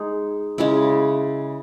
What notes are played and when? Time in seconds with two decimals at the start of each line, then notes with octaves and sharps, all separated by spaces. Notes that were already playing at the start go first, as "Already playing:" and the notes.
Already playing: G#3 D#4 G#4
0.58 C#3 G#3 C#4 E4